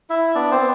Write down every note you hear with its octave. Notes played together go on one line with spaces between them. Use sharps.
E4 E5
B3 D4 D5
C4 C5
B3